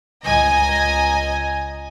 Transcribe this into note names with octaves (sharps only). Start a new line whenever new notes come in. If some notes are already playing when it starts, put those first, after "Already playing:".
C#2 D#5 G#5 A#5